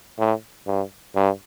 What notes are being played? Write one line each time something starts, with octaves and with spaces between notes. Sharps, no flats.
A2
G2
G2